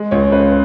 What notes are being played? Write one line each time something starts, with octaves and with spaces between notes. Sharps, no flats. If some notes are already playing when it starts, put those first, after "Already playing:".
Already playing: G#3
C#2 C#5
C#3 B4